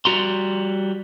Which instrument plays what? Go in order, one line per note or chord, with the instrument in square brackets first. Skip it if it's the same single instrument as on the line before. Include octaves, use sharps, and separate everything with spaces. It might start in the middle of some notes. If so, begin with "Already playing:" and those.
[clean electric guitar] G3 F#4 A#5 C6